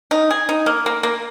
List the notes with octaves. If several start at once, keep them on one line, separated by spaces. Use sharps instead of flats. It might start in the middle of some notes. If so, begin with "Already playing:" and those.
D#4
G#4
D#4
A#3
A#3
A#3